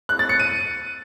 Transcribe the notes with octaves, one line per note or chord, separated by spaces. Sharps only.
F#6
A6
C#7
D#7